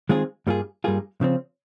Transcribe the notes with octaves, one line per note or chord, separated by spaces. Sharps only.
D#3 G#3 C4 F4 G#4
G2 G3 A#3 F4 G#4
G2 G3 A#3 F4 G#4
C#3 F3 C4